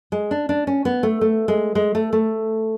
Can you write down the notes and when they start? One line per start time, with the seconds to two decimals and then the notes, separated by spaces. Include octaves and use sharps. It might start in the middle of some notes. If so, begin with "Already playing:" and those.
0.12 G#3
0.31 D4
0.49 D4
0.67 C#4
0.85 B3
1.03 A3
1.21 A3
1.48 G#3
1.75 G#3
1.95 A3
2.13 A3